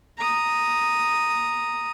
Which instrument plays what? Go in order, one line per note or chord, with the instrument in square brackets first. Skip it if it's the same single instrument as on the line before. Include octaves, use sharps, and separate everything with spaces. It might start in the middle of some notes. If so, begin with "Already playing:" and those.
[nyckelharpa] A#5 D#6